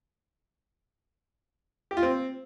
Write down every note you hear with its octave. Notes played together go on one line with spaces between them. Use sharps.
G4
F4
C4